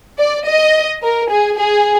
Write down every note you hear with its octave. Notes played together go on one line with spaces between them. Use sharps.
D5
D#5
A#4
G#4
G#4